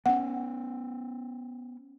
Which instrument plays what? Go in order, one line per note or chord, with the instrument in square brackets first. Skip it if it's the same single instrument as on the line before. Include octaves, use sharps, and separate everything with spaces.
[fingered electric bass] B3 C#4 [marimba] F#5